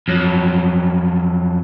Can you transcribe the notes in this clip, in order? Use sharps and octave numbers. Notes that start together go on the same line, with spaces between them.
F2 F#3